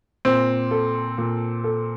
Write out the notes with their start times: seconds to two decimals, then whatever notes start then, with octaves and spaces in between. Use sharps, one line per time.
0.25 A#2 C4
0.71 A4
1.18 A#2
1.64 A4